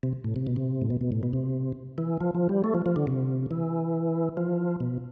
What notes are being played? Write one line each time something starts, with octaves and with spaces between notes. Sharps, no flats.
C3
A2
C3
B2
C3
A2
B2
B2
A2
B2
C3
E3
F3
F3
G3
A3
F3
F3
D3
C3
E3
F3
B2